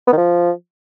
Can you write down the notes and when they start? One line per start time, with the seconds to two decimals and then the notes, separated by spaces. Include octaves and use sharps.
0.07 B3
0.12 D#3
0.18 F3